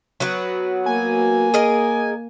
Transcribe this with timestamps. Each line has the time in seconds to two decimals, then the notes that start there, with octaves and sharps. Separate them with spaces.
0.20 F#3 B3 F#4
0.86 A#3 G#5
1.54 G#4 A#4 D#5